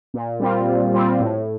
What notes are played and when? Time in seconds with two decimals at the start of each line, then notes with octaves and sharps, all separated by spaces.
0.14 A#2
0.40 G3 C4 F4
0.67 A#2
0.93 G3 C4 F4
1.20 A2